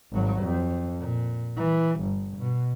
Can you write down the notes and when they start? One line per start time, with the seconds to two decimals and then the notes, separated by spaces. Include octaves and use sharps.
0.12 G#1 F#3
0.43 F2
0.99 A#2
1.57 E3
2.01 G1
2.37 B2